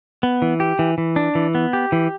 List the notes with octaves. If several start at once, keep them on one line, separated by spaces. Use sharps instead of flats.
B3
E3
G4
E3
E3
D4
E3
B3
G4
E3